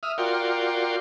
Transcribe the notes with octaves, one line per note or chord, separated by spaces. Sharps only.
E5 D#6 F6
F4 F#4 A#4 D5 G5 C6